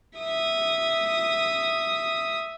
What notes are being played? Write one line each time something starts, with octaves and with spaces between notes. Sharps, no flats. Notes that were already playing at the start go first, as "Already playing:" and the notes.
E5 D#6